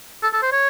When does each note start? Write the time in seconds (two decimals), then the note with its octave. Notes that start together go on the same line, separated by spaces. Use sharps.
0.23 A4
0.33 A4
0.43 C5
0.52 C#5